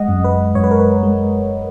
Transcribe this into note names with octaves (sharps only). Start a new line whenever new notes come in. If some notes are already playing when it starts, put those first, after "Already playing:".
Already playing: G#3 D#5 F#5
F#2
B4
F#2 C#5
B4
A#4
B4
G#3